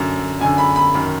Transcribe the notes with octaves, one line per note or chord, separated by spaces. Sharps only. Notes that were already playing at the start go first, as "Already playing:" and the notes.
Already playing: F#2 D3
F#2 D3 G#5
B5
B5
F#2 D#3